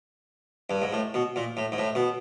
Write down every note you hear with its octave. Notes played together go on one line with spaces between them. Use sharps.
G2
G#2
A2
B2
A#2
A2
G#2
A2
B2